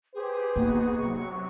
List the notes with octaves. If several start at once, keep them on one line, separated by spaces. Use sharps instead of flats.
G4 G#4 B4 C5
A#3 B3 D#4 F#4
C3 F#3 C#6